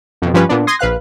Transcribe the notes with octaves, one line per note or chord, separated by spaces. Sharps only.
F2 B2
G2 F3 G3 C#4 B4
A#2 B3 D4
C6 D#6 G#6 A#6 C7
A#1 B4 F5 F#6